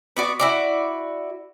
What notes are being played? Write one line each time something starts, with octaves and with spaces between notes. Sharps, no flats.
B3 F#4 D5
E4 F#4 D5